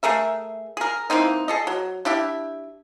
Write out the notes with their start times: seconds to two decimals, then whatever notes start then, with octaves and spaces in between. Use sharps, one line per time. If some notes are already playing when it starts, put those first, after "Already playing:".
0.03 A3 G#4 A#4 E5
0.77 G#4 A#4
1.10 E3 A#3 C4 D#4
1.48 G#4 A4 D#5
1.67 F#3
2.05 D4 E4 G4 E5